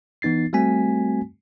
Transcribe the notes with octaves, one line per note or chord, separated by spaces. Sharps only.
E3 B3 D#4 A6 C7
G3 A3 C4 F#4 G#5 B6